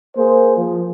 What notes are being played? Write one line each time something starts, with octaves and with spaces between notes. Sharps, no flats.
A#3 G#4 C5
F3